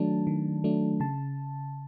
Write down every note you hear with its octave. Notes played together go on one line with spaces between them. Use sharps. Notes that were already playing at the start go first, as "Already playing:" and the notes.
Already playing: D#3 F#3 A3 D4 A5
D#3
F#3 A3 D4
C#3 A5